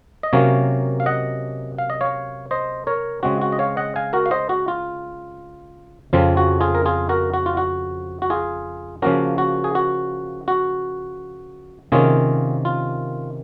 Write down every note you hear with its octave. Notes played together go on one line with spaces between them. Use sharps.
D#5
C3 F#3 A#3 C#4 C#5 F5
F5
D#5 F#5
F5
D#5
C#5 F5
C5 D#5
A#4 C#5
C#3 G#3 C4 F#4
F#4
D#5
C#5 F5
D#5 F#5
F5 G#5
F#4 A#4
F5
C5 D#5
F#4
F4
F2 C#3 F3 C4 F4
F#4
F4 G#4
A#4
F4 G#4
F#4 A#4
F#4
F4
F#4
F#4
F4 G#4
C#3 F3 A#3 C#4 F#4 A#4
F#4
G#4
F#4
F#4
C3 D#3 A#3 C#4 F4 G#4
F4